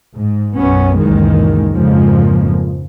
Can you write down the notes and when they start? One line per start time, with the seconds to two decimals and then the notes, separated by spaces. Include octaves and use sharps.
0.14 G#2
0.55 B1 F#2 F#3 B3 C#4
0.98 C#2 F#2 A#2 D#3 E3 G#3
1.73 F2 G#2 C#3 F3 G#3 A#3